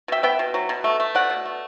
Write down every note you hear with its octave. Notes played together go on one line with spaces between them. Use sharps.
B2 E5 G5
B3 E5 G5
B2
F#3
B2
A3
A3
B2 D5 F#5
B2
A3